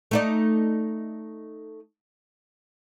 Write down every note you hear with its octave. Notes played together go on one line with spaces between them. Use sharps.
A3 D#4 D5